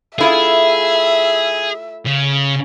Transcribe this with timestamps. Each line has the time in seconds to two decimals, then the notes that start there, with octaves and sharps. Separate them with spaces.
0.18 A3 E4 F4 G#4 E5
2.06 C#3